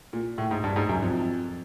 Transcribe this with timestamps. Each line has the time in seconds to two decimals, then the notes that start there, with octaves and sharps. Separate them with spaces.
0.13 A#2
0.38 A2
0.51 G#2
0.64 G2
0.76 G#2
0.89 F#2
1.02 F2